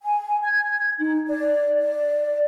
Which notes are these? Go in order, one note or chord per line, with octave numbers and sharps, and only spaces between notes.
G#5
G#6
D#4
D5
D5